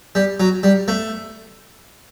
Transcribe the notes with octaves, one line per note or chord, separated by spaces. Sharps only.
G3
F#3
G3
A3